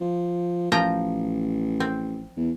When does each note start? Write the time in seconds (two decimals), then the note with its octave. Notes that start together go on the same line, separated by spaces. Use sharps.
0.01 F3
0.72 A1 F3 G5 A#5
1.80 C4
2.37 E2